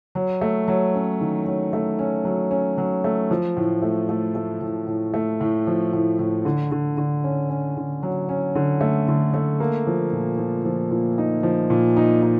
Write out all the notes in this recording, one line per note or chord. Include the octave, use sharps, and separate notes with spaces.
F#3
A3
F#3
C#4
D#3
F#3
A3
C#4
F#3
C#4
F#3
A3
F3
A2
A3
A3
A3
A2
A2
A3
A2
F3
A2
A2
D3
D3
D3
C#4
C#4
D3
F#3
C#4
D3
A3
D3
A3
A#3
F3
A#2
F3
F3
A#2
D#4
F3
A#2
D#4
D#4